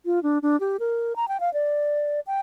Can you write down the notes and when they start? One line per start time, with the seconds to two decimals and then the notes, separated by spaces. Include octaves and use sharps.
0.06 F4
0.23 D4
0.42 D4
0.60 G4
0.80 A#4
1.16 A#5
1.28 G5
1.40 F5
1.54 D5
2.27 G5